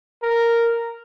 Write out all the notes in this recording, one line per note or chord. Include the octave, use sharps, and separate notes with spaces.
A#4